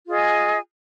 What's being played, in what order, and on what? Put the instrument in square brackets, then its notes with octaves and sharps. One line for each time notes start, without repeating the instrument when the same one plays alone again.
[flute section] F4 G#4 D#5 G#5